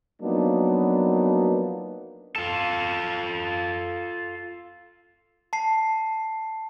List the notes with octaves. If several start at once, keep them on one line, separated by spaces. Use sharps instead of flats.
F3 F#3 A#3 B3 D4 D#4
F4 A4
A5 C7